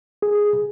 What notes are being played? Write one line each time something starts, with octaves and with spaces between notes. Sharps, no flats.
G#4